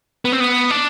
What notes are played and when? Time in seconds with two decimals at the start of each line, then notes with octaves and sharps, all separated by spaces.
0.25 B3
0.32 C4
0.40 B3
0.71 D4